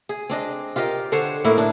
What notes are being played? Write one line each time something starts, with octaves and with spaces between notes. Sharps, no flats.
G#4
C4 D4 D#5
F4 G4 A#4 D#5
D3 D4 C5 C#5
A2 A#3 E4
D4